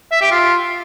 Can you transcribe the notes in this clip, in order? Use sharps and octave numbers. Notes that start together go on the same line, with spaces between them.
E5
G4
F4